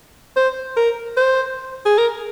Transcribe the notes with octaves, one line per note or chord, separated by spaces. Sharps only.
C5
A#4
C5
G#4
A#4